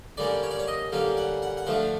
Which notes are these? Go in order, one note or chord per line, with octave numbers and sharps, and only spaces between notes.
D3 G3 A#3 C#4 D5
C#5
D5
C#5
D#5
D3 G3 A#3 C#4 F5
F#5
F#5
F#5
D3 F3 A3 D4 F5